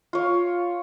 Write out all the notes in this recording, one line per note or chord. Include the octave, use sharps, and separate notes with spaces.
F4 C#5